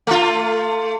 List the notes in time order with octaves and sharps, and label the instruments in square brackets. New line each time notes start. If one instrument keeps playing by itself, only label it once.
[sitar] A3 F4